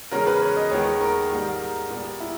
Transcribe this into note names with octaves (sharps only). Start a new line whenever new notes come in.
E2 C#3 G#3 C#4 A#4
B4
C#5
D#5
D#2 D#3 G#3 B3 C#5
A#4
G#2 G3 A#3
A#2 G3 B3
E4